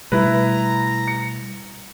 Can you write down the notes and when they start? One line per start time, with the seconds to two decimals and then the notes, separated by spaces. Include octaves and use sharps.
0.12 B2 G3 A3 E4 B4 A#5
1.08 C#7